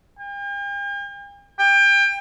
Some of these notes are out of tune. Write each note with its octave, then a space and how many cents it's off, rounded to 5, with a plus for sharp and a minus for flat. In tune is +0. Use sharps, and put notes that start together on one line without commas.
G5 +45
G5 +25